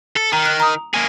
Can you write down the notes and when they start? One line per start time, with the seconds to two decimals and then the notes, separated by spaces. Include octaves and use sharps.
0.16 A4
0.33 D#3 A#5
0.46 F#6
0.60 A#5 D#6
0.94 A#3 G#4